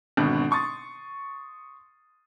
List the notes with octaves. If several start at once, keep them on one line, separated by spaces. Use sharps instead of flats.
G#1 B2 D3
C6 C#6 D#6 A6